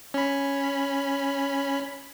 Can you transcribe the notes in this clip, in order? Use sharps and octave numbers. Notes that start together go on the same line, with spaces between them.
C#4 B5